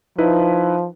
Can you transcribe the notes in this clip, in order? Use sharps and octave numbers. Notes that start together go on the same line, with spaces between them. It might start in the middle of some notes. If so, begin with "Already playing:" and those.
F3 D#4 E4 B4